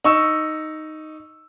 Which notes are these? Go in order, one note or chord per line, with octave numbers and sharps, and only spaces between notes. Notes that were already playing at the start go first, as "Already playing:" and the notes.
D#4 C#6 E6